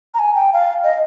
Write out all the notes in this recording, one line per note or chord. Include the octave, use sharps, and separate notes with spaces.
A#5
G#5
G5
F5
D#5